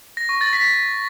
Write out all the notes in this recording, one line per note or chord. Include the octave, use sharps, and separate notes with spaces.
A#6
C#6
A6
B6